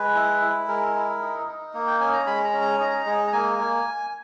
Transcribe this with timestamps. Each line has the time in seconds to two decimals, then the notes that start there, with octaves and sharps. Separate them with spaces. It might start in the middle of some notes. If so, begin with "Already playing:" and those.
Already playing: G#3 B4
0.15 E4
0.42 E4
0.67 G#3 A#4
0.95 E4
1.21 D#4
1.48 D#4
1.74 A#3
1.87 G5
2.01 C#4 G#5
2.13 A#5
2.27 G#3 B5
2.44 A#5
2.53 C#4
2.61 A#5
2.79 D#4
3.06 G#3
3.27 A#5
3.32 A#3 G#5
3.59 A#3